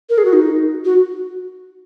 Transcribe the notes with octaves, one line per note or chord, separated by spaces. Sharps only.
A#4
G#4
F#4
D#4
F#4